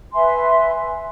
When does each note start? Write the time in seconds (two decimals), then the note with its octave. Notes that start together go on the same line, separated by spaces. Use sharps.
0.14 B4 E5 G#5 C6